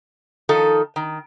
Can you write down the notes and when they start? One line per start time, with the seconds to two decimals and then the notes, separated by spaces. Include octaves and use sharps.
0.49 D#3 F3 D#4 A4
0.96 D#3